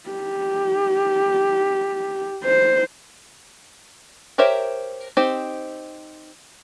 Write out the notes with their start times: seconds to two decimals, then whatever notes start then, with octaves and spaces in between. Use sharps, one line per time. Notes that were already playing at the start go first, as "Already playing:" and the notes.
0.10 G4
2.44 C5
4.38 G4 A#4 C5 C#5 E5
5.17 C4 D#4 G4 C5